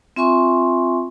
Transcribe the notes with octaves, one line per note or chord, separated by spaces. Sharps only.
C4 F4 E5 G#5 C6 C#6